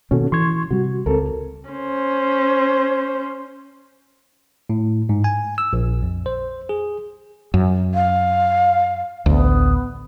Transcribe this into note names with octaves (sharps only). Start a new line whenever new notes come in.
B2 D#3 A#3 C#4 F#4 A4
E3 C6 C#6 G#6
C3 G3 F#4
C#2 C4 A4 A#4
C#4 C5
A2
G#2
G#5
E6
A#1
F2
C5
G#4
F#2
F5
A1 D2 B3